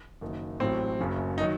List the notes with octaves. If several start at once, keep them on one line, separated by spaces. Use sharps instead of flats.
F#1 F#2 D#3
A1 A2 F#3 C4
F#1 F#2 C#3 F#3
D#4
D#3 F#3